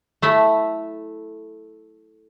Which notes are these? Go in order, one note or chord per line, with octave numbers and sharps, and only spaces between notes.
A3 E4 B5